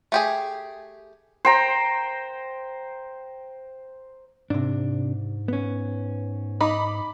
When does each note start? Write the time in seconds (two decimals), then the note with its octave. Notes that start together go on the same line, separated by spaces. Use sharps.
0.12 A3 G4 G#4
1.45 C5 G5 A#5
4.50 G#2 C3 D4
5.48 B3 C#4
6.61 D#4 B5 D6